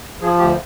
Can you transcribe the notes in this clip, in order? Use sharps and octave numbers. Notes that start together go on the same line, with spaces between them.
F3 G#4
D2 G4